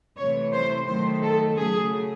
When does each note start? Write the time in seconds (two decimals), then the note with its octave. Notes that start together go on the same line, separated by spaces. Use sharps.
0.18 C3 E3 A3 C#5
0.53 C5
0.86 D#3 F#3 A3 C5
1.23 A4
1.56 C#3 F#3 A3 G#4